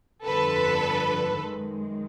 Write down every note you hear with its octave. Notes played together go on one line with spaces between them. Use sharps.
G1 F2 D3 A4 B4
F#2 D#3 G#3